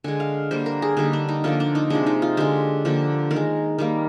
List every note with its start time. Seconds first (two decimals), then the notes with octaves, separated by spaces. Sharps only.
0.04 D3 G#3 G#5
0.20 F5
0.51 D3 G3 A#3 C5
0.66 A#4
0.82 G#4
0.97 D3 G3 A#3 D#4
1.13 D4
1.29 D#4
1.44 D3 F3 A#3 F4
1.60 D4
1.75 D#4
1.90 C3 F3 G#3 D4
2.06 D#4
2.22 F4
2.37 D3 G#3 G4
2.85 D3 F3 A#3
3.31 D#3 A#4
3.36 G#3
3.79 D#3 G3 A#3